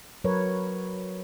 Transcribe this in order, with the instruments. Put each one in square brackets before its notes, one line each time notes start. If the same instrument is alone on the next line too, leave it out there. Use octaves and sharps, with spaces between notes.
[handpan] F#3 A#4 B4 C#5